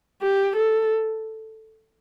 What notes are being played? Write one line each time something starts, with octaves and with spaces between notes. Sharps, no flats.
G4
A4